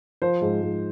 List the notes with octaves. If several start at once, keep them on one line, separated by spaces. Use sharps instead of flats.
F3 C5
G#2
G#2